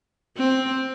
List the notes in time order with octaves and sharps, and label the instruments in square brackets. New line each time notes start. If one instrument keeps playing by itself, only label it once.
[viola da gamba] C4